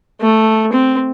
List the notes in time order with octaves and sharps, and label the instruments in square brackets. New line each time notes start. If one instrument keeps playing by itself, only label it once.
[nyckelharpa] A3
C4